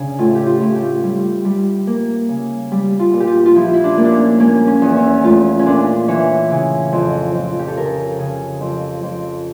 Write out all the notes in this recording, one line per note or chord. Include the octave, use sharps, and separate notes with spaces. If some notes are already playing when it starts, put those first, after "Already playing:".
Already playing: C#3 D4
A2 F4
G4
F4
A2
G4
G3
G3
A#3
C#3
G3
F4
A#2
G4
F4
F4
F3 E4
E4
D4
A#3
D4
C#4
A#3 C#4
C#4
E2
C#4
A3 F4
C#4
A#2 D4
E3 C#5
C#3
F2
F2
F4
G4
A4
C#3 A#4
C#3
F2
F2